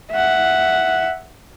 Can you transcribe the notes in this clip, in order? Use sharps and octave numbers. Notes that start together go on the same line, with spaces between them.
E5 F#5